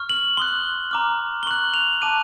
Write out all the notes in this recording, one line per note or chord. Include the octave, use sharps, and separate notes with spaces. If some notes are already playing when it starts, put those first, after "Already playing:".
Already playing: C#6 F6
F#7
C6 D#6 F#6 G7
A#5 D6 F6
G7
C#6 F#6 F#7
F7
A5 D6 F#6 D#7